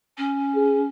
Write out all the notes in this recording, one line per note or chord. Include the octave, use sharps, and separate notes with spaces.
C#4
G#4